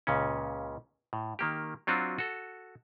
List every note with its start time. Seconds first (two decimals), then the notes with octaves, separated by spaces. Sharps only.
0.07 C#2 A#2 C#3 C#4
1.13 A2
1.39 D#3 A#3 G4
1.87 F#3 C4 D4 F4 F#4
2.18 F#4 A4